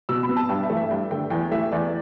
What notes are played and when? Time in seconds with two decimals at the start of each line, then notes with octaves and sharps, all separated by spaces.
0.09 B2 E6
0.23 B5
0.29 B3
0.36 A5
0.49 G2 G5
0.63 E5
0.70 E3 A3
0.77 E5
0.90 G2 G5
1.11 D3 A3 G5
1.30 E2 G5
1.51 E3 A3 E5
1.72 E2 D5